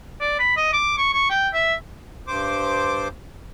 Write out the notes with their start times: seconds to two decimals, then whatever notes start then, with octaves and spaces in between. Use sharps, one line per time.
0.21 D5
0.39 B5
0.57 D#5
0.73 D6
0.98 C#6
1.13 C#6
1.30 G5
1.53 E5
2.27 G2 C5 D6